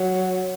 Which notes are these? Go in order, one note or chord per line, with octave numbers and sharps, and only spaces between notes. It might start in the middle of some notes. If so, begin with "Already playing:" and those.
Already playing: F#3